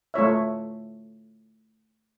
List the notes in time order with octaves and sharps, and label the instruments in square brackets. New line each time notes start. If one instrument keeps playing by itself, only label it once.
[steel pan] A3 F4 C#5 E5